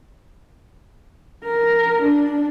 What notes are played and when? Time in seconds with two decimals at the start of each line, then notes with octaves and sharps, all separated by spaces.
1.45 A#4
2.02 D4